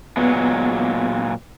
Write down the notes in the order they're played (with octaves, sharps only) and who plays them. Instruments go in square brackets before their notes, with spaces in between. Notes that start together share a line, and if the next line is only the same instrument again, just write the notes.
[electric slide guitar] A#2 F#3 G#3 [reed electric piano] B3